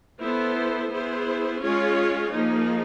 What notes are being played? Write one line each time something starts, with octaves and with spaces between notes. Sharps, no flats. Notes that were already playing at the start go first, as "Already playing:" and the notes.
B3 E4 A4 C5
B3 E4 G#4 C5
G#3 C#4 F4 G#4 C#5
F3 A#3 D#4 G#4